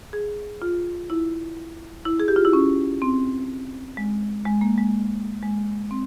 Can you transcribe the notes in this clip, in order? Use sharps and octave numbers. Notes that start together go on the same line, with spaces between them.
G#4
F4
E4
E4
G#4
G4
F4
E4
C#4
C4
G#3
G#3
A#3
G#3
G#3
C4